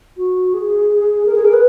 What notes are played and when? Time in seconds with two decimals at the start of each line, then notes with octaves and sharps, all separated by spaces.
0.17 F#4
0.54 G#4
1.26 A#4
1.35 G#4
1.45 A#4
1.53 B4